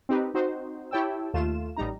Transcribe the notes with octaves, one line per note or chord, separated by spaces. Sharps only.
C4 D#4 G4 B4
C4 D#4 F#4 C5
E4 G4 C#5 G5 A5 E6
D#2 A3 F4 E7
A1 G3 D#4 A#5